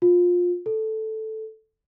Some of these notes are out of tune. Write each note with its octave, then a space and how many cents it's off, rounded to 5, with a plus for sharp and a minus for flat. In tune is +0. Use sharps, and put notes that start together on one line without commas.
F4 +20
A4 -5